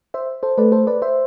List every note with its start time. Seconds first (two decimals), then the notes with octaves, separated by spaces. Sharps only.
0.14 C5 E5
0.43 A4 C5
0.58 A3 B4 D5
0.72 A4 C5
0.87 B4 D5
1.02 C5 E5